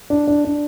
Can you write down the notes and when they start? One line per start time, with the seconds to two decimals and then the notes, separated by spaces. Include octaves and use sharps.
0.10 D4
0.27 D4
0.45 D4